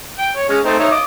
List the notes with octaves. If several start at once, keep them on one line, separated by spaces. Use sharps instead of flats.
G5
C#5
G#3 C#4
A3 C4 D#4
D#4 C#5 E5
D#5 D6